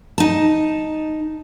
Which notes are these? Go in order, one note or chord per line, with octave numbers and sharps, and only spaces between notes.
D#4 A5